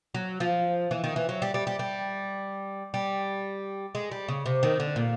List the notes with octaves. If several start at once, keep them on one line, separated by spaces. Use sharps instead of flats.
F#3
F3
E3
D#3
E3
F#3
G3
G3
G3
G3
G3
G#3
G3
C#3
C3
D#3
D3
A#2